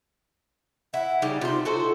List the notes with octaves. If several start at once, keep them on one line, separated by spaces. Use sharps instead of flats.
E4 F#5
C#3 G3 D#4
C3 F4 C5
F#4 A4 C5